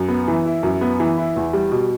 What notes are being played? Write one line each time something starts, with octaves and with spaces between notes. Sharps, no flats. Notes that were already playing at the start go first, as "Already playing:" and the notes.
Already playing: F#2
B3
E3
E4
F#2
B3
E3
E4
E2
G3
B2